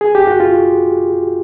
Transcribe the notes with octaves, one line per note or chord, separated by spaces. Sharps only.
G#4
G4
F#4
F4